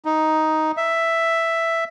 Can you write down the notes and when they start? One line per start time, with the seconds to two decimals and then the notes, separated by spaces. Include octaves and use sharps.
0.05 D#4
0.77 E5